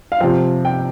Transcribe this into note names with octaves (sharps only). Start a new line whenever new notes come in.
F5
C3 F3 G5
G5